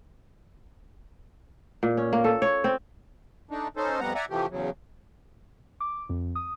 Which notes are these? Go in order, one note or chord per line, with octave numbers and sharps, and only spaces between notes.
A#2
C#4
A#3
A4
C#5
C4
A3 D4 D#4
C#4 D#4 A4 C5
F2 G3 B3 F#5 A#5
D5 E5 F#5 G#5 A#5
C3 E3 F3 A3 G4
E2 C#3 F#3
D6
F2
D#6